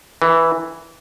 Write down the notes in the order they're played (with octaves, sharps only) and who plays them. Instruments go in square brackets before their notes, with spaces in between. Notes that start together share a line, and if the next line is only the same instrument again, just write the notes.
[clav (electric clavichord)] E3